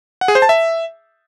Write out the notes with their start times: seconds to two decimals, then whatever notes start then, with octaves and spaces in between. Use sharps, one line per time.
0.21 F#5
0.28 G#4
0.35 C5
0.42 A5
0.49 E5